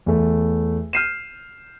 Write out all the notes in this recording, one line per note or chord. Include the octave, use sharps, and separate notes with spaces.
E2 A3
F6 G6 C7 D#7 E7